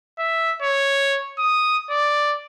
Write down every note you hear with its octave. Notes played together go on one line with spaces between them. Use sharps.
E5
C#5
D#6
D5